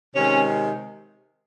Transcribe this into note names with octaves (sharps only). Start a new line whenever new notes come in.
C3 D#3 G#3 C#4